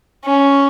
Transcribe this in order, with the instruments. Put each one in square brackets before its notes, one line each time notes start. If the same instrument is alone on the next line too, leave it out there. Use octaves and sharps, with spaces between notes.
[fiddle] C#4